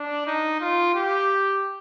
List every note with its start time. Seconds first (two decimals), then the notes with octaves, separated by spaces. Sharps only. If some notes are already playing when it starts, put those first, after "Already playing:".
Already playing: D4
0.27 D#4
0.61 F4
0.94 G4